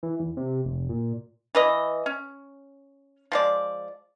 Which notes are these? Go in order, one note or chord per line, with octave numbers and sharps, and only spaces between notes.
E3
E2
C3
F1
A#2
E3 B4 D#5
C#4
F3 G#3 D5